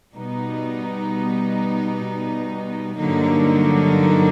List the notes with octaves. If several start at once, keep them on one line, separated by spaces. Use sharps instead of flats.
B2 G3 B3 D#4
G2 D3 F#3 A#3 D#4